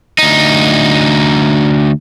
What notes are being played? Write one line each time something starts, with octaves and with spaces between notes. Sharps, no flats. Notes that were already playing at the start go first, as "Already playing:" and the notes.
D2 D#4